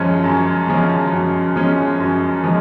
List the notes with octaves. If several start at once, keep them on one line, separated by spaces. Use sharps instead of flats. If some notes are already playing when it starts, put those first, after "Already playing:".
Already playing: F#2 F3 G#3 C#4
F#2
F3 G#3 C#4
F#2
F3 G#3 C#4
F#2
F3 G#3